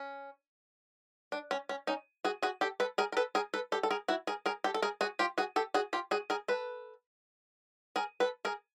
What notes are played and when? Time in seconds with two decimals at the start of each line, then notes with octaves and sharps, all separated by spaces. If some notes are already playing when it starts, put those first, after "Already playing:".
Already playing: C#4
1.32 D4
1.51 C#4
1.69 C#4
1.87 C#4 D#4
2.24 F#4 G#4
2.42 F#4 G#4
2.61 G4 A4
2.80 A4 B4
2.98 G#4 A#4
3.12 A#4
3.17 A4 B4
3.35 G#4 A#4
3.54 A4 B4
3.72 G4 A4
3.83 A4
3.90 G#4 A#4
4.08 E4 F#4
4.27 G#4 A#4
4.46 G#4 A#4
4.64 G4 A4
4.74 A4
4.82 G#4 A#4
5.01 F#4 G#4
5.19 F4 G4
5.38 F#4 G#4
5.56 G4 A4
5.74 F#4 G#4
5.93 F4 G4
6.11 F#4 G#4
6.30 G#4 A#4
6.48 A4 B4
7.96 G#4 A#4
8.20 A4 B4
8.45 G#4 A#4